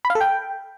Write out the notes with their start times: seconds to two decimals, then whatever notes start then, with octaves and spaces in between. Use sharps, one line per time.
0.05 B5
0.10 F5
0.15 A4
0.21 G5